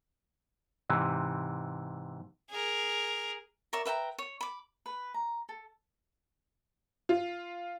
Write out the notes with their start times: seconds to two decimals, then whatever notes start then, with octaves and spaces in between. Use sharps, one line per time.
0.90 G#2 C3 E3
2.50 G#4 A#4
3.73 A#4 C#5 D5 E5
3.85 B4 E5 G5 A#5
4.18 C#5
4.41 B5 D6
4.86 B4
5.14 A#5
5.49 A4
7.09 F4